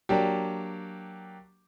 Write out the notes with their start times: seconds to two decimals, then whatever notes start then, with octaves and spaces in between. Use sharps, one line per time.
0.09 F#3 A#3 D4 G4